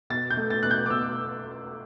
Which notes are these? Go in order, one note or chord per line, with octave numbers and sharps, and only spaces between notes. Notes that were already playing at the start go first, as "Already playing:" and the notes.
B2 A6
G6
A3
A6
B2 F#6
G6
D6
B2 E6